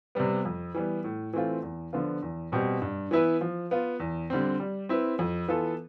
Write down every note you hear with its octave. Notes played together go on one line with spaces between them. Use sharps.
C3 G3 B3
F2
E3 G3 B3
A2
E3 A3 C4 F4
E2
D3 F3 B3 F4
E2
B2 G3 C4 G4
G2
E3 B3 E4 B4
F3
B3 F4
E2
D3 G3 C4
G3
C4 E4 B4
F2
E3 B3 F4 A4